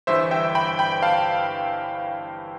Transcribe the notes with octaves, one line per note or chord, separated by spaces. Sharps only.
G1 G2 E3 C5 E5
E5 G5
G5 B5
G5 B5
F5 A5